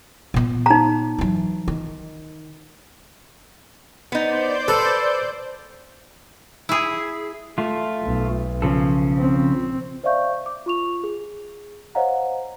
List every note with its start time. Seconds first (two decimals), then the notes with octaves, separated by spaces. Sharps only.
0.34 A#2 B3
0.66 D#4 A#5
1.18 E3 F#3
1.68 D#3
4.12 B3 D#4 C5 D5 G6
4.68 A4 B4
6.69 E4 G#4
7.58 A3 F4
8.04 B1
8.62 C#3 F3 A4
9.17 C4
10.03 C5 D5 E5 F5 C#6 G6
10.46 D6
10.66 F4 C#6 F7
11.04 G#4
11.95 C5 C#5 D#5 F5 F#5 A#5